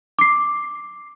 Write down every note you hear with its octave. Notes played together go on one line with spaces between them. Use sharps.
D6 C7